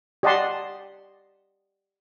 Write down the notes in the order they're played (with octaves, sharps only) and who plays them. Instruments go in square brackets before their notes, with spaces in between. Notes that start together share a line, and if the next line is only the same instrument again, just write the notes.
[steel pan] G4 D5 D#5 F#5 A5 C6